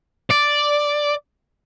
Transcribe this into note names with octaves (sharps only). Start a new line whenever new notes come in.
D5